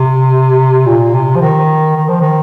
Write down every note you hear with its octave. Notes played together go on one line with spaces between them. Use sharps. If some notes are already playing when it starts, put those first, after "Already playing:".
Already playing: C3
A#2
C3
F3
D#3
D#3
F3
D#3